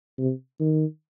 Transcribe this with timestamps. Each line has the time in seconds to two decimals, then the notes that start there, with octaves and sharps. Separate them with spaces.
0.19 C3
0.60 D#3